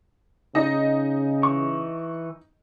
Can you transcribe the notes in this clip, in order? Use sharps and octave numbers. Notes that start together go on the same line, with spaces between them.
C#3 D#4 D#5
E3 C#6